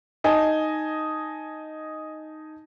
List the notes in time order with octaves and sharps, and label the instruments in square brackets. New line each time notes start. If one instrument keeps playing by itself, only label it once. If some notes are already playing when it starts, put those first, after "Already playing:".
[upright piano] D#4 D#5 G#5 A5